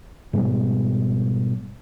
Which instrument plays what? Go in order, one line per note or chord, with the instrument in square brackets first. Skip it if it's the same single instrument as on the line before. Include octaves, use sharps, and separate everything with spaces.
[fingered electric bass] G#2 B2 G3 B3